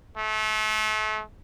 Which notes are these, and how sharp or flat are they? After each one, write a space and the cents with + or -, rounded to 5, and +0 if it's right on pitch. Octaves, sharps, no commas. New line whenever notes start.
A3 -35